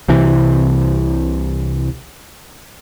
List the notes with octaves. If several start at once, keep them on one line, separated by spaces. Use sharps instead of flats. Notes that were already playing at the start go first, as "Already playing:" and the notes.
C2 C3 E3